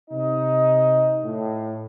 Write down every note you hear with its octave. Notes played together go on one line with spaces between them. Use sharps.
C3 D#4 D#5
A2